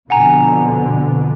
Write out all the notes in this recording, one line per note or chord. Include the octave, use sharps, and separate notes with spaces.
F2 B2 D3 F#5 G#5 A#5